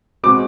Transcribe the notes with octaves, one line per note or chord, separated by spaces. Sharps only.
B2 G#3 C4 D6